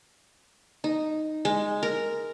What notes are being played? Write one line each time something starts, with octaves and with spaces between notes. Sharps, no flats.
D#4
G#3
A#4